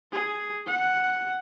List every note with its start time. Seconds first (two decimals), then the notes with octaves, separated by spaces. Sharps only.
0.12 G#4
0.67 F#5